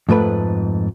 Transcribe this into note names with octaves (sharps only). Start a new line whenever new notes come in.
F2 G#2 A3 B4 B5